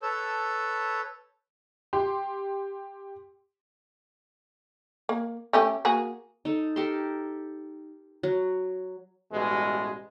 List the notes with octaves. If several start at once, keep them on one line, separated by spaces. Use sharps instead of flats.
A4 B4 C#5 A5 E6 G6
G4 C6
A#3
A3 C#4 G4
A#3 F#4 G#4
D#4 A4
G4 A4 A#4 C6
F#3
A1 B2 G3 G#3